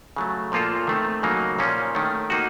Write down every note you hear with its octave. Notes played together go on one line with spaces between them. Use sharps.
C#3 F#3 A3
A#2 F3 A#3 F4 A4
D#3 A3 C4
C#3 F#3 A#3 D#4
A#2 F3 A#3 C#4
D#3 A3 C#4
A#3 D#4 F#4